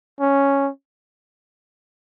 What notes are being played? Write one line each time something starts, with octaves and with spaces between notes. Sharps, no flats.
C#4